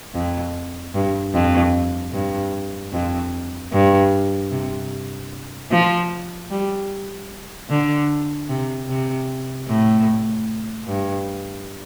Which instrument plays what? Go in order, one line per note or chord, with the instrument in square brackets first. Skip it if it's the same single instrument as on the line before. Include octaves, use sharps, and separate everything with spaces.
[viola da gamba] F2
G2
F2
G2
F2
G2
C3
F3
G3
D3
C3
C3
A2
G2